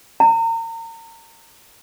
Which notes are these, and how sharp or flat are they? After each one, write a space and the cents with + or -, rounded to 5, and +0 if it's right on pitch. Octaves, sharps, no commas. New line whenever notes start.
A#5 -35